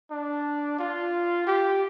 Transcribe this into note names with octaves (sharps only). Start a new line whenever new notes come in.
D4
F4
G4